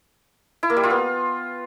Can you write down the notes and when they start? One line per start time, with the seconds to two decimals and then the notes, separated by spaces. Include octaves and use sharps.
0.63 E4
0.70 A#3
0.77 G3
0.84 F4
0.90 B3